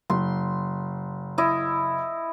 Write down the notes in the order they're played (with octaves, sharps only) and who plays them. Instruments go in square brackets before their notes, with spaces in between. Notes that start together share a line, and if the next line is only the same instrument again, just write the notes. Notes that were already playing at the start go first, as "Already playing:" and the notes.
[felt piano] F#1 [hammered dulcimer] C6
[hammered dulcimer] E4 D#5